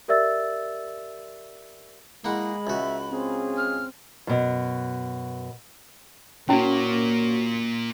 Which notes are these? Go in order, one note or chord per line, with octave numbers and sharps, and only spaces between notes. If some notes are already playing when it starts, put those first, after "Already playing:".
G4 A#4 D5 E5 E6 A6
G#3 A#3 E4 F#5 B5
C#2 F#4 E5
C4 C#4 F4 G#4
F6
F#2 B2
A#2 A#3 C#4 E4 F#4 C#5